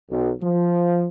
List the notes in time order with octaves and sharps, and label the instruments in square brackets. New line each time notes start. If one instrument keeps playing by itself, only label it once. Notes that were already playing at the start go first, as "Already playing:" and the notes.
[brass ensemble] B1
F3